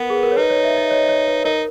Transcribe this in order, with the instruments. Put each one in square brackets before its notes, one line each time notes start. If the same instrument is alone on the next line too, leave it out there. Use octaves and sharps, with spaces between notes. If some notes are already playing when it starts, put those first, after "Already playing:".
Already playing: [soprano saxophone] B3 [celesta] A#4 B4
[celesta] G#4
A#4
C#5
[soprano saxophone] D#4 [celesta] B4
[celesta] C#5
E5
D#5
C#5
C#5
B4
[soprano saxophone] D#4 [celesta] A#4